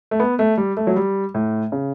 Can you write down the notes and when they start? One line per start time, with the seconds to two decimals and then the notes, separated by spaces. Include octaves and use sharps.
0.11 A3
0.20 B3
0.39 A3
0.57 G3
0.77 A3
0.87 F#3
0.96 G3
1.34 A2
1.72 C#3